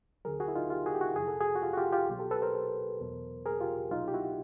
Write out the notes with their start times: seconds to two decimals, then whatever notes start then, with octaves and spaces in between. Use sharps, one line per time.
0.25 D2 D3 F#3 G#4 A#4
0.40 F#4 G#4
0.48 E4
0.56 D#4 F4
0.70 F4 G4
0.86 F#4 G#4
0.94 G4
1.01 E4 F#4
1.16 F2 C3 F3 G#4
1.28 A4
1.40 F#4 G#4
1.56 F#4
1.62 F4 G4
1.73 F#4
1.77 F4 G4
1.93 F4 G4
2.08 C2 B2 F#3
2.19 G4 A4
2.31 A4 B4
2.42 A#4 C5
3.00 E2 B2 F#3
3.46 G#4 A#4
3.60 F4 G4
3.91 C2 B2 F#3 D#4 F4
4.08 G4
4.14 E4 F#4